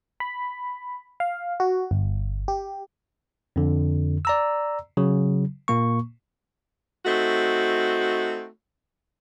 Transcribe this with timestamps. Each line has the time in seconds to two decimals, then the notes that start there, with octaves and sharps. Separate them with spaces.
0.20 B5
1.20 F5
1.60 F#4
1.91 G1
2.48 G4
3.56 F2 D3
4.25 D5 A#5 E6
4.97 C#3 F#3
5.68 A#2 A#3 C#6
7.05 A3 C4 D#4 F#4